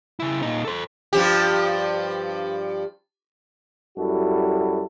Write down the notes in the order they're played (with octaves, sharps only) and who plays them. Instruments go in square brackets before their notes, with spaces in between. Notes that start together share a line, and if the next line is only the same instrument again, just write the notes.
[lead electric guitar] C#3 E4
A#2 D#4
A4 C5
[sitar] G2 F3 G4
[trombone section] F#2 G3 E4 F#4 A4